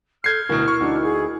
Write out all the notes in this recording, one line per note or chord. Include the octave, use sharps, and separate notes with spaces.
A4 F6 G6 G#6 C7
D2 B2 E4 A#4
C#6
D2 D4 D#4 F#4
G#4